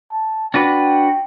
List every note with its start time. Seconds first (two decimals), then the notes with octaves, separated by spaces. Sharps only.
0.12 A5
0.54 D4 F#4 B4 G5